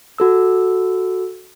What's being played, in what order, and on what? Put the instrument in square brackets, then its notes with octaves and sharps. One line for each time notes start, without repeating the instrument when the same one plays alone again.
[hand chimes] F#4 A4 E6